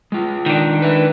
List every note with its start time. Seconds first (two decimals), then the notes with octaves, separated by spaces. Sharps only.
0.12 G#3 F4
0.46 D#3 D4
0.82 B4 E5